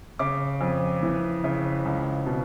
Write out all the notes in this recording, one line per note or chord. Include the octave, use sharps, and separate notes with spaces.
C#3 D6
F2
E3
C#3
C#2
B2